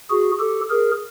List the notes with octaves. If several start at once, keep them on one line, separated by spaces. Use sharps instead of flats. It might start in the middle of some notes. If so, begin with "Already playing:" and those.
F#4 G#4
G4 A4
G#4 A#4